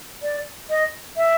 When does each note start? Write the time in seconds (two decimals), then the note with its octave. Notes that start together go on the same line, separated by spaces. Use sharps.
0.22 D5
0.70 D#5
1.17 E5